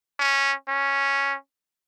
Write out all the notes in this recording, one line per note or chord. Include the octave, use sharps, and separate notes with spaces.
C#4
C#4